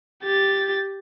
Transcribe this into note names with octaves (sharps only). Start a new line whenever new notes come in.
G4 A6